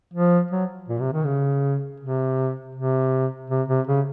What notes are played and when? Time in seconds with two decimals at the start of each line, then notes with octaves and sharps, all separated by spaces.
0.14 F3
0.51 F#3
0.88 A#2
1.00 C3
1.13 D#3
1.25 C#3
2.00 C3
2.75 C3
3.50 C3
3.68 C3
3.87 C#3